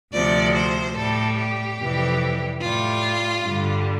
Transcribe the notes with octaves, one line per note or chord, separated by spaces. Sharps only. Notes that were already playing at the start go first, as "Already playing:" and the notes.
D2 C3 F3 D5
C5
A2 G3 A4
G4
F2 C3 E3 G3
A2 G3 F4
G2 D3 G3